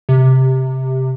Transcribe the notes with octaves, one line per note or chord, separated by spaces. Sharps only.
C3